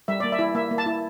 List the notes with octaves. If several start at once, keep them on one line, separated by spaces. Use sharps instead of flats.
G3 E5
A#3 D5
E5
E4
A#3 E5
A#3
A5
E4